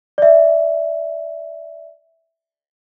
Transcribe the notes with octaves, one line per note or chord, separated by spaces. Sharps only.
D5 E5